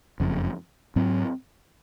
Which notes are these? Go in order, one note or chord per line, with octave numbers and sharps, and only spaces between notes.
F#1 F2 C#3
G#2 F#3 C4